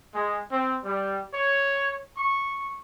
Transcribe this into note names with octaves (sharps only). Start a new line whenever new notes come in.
G#3
C4
G3
C#5
C#6